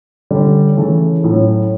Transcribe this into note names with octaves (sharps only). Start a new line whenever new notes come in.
D3 G3 C#4
C#3 E3 A3
A2 F#3 C#4 E4